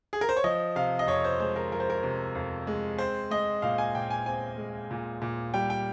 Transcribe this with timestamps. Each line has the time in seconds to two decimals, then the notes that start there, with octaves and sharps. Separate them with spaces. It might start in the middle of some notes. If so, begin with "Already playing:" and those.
0.13 G#4
0.21 A#4
0.29 C5
0.37 C#5
0.44 F3 D#5
0.76 C3 F5
0.99 D#5
1.07 F2 C#5
1.24 C5
1.40 G#3 C5
1.56 A#4
1.72 F3 A#4
1.80 C5
1.90 A#4
2.03 C3
2.35 F2
2.67 G#3
2.98 C4 C5
3.31 G#3 D#5
3.62 A#2 F5
3.78 G#5
3.95 A#2 G5
4.10 G#5
4.26 C4 G#5
4.58 G#3
4.91 A#2
5.22 A#2
5.54 G3 G5
5.70 G5